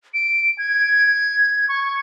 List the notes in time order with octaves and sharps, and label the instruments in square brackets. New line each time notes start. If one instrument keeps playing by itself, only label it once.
[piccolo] D7
G#6
C#6